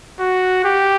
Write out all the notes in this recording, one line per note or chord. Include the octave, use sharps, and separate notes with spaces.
F#4
G4